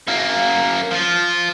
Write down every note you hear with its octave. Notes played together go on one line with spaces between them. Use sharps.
F#2 A#3
F3 F4